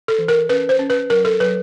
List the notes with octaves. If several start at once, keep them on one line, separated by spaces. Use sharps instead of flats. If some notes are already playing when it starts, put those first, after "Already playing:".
A4
E3
A#4
C#4 B4
C5
C#4
B4
F#3 A#4
A4
F#3 B4